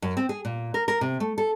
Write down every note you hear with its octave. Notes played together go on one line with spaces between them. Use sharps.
F#2
C4
G#4
A#2
A#4
A#4
C3
A3
A4